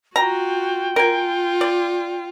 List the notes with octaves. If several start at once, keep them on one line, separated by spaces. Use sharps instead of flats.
F4 F#4 G5 A#5
F4 A#4 G#5
D5